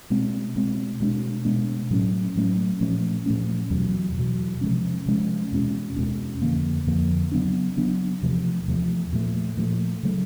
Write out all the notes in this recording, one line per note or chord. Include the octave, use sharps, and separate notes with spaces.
B2 G#3 C4
B2 G#3 C4
B2 G#3 B3 D4
B2 G#3 B3 D4
A2 F#3 A3 C#4
A2 F#3 A3 C#4
A#2 F3 A3 C#4
A#2 F3 A3 C#4
E2 B2 F#3
E2 B2 F#3
C3 F3 G#3 C#4
C3 F3 G#3 C#4
E2 B2 G#3 C#4
E2 B2 G#3 C#4
F2 D3 F3 A#3
F2 D3 F3 A#3
C#3 F#3 B3 D4
C#3 F#3 B3 D4
E2 C3 F3 A3
E2 C3 F3 A3
A#2 F3 A3
A#2 F3 A3
C#3 F#3 A3